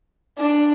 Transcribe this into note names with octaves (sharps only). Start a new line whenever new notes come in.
D4